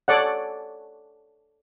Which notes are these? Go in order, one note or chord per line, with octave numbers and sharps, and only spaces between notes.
A4 C#5 D5 F#5